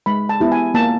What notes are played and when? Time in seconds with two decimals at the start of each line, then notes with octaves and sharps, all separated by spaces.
0.06 G#3 B5
0.29 A5
0.40 B3 E4 G4
0.52 G#5
0.74 A#3 A5